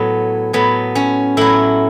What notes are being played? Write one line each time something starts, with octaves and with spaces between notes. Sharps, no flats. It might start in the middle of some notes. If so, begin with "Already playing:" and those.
Already playing: A2 F#3 B3
A2 F#3 B3
C#4
A2 F#3 E4